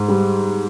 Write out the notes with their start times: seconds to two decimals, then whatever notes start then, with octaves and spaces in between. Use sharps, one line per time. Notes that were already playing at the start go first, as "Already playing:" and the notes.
Already playing: G#2
0.08 G3